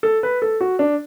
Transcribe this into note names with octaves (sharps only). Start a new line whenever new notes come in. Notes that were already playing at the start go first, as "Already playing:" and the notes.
A4
B4
A4
F#4
D4